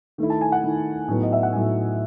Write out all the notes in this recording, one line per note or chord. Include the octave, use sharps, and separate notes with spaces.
D#3 A3 E4
A5
G#5
F#5
D#3 A3 E4
A2 F#3 B3 D#4
D#5
E5
F#5
A2 F#3 B3 D#4 G#5